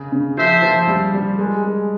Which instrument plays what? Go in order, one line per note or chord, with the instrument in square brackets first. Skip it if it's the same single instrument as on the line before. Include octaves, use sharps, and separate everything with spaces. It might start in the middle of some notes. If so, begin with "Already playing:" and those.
Already playing: [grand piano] C#3
C#3
[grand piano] F3 [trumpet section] C5 E5
[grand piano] F3
G3
G3
G#3
G#3